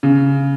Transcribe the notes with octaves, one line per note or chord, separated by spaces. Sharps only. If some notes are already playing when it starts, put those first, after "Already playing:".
C#3